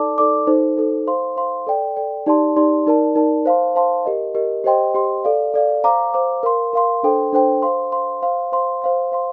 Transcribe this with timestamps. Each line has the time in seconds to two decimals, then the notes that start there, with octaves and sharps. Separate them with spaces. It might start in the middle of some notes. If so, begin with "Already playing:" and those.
Already playing: D#4 A4 D5 A5 D6
0.18 D#4 A4 D5 A5 D6
0.47 D#4 A4 C5
0.78 D#4 A4 C5
1.07 C5 F5 C6
1.36 C5 F5 C6
1.67 A4 D5 G5
1.97 A4 D5 G5
2.26 D#4 G4 D5 A5 C6
2.56 D#4 G4 D5 A5 C6
2.86 D#4 A#4 D5 A5
3.16 D#4 A#4 D5 A5
3.45 C5 F5 A5 C6
3.76 C5 F5 A5 C6
4.05 G4 A#4 D#5
4.35 G4 A#4 D#5
4.64 G4 C5 D#5 G5 C6
4.95 G4 C5 D#5 G5 C6
5.24 A4 D5 F5
5.54 A4 D5 F5
5.84 C5 F5 A#5 D6
6.14 C5 F5 A#5 D6
6.43 A#4 F5 C6
6.73 A#4 F5 C6
7.03 D4 A4 C5 G5 C6
7.33 D4 A4 C5 G5 C6
7.62 C5 F5 C6
7.92 C5 F5 C6
8.22 C5 F5 C6
8.52 C5 F5 C6
8.82 C5 F5 C6
9.12 C5 F5 C6